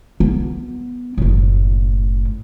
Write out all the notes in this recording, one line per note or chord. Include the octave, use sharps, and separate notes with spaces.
B3
F#1 A2